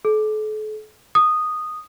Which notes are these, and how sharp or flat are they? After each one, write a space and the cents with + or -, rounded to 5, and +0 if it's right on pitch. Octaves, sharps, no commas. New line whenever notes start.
A4 -40
D#6 -10